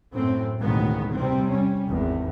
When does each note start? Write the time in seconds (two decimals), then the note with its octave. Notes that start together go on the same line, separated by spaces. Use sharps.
0.13 F#2 A2 C4
0.60 A1 D2 B2 D#3 G#3 B3
1.14 E2 C3 G3 C4
1.50 G3 C#4
1.88 G#1 E2